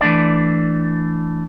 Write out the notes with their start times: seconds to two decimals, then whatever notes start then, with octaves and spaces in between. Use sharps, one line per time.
0.01 E3 A3 D4 D5